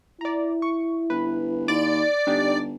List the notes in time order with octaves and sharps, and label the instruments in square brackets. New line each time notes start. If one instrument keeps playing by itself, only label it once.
[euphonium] E4 [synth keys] D5 A#5
[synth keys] C#6
[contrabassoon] G1 [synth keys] B4
[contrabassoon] D#2 [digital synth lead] D5 [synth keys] A6
[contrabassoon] G1 [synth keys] D4 D#4 G4